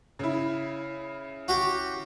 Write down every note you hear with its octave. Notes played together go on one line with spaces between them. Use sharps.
C#3 E4
F#4 G4